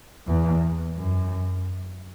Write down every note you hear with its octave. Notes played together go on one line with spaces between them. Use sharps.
E2
F#2